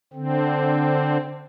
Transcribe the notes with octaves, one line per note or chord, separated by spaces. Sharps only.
D3 C4